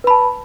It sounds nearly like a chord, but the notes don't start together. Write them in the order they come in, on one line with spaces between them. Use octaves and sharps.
B4 B5 A5